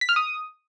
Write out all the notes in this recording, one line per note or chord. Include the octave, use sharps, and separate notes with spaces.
B6
F6
D#6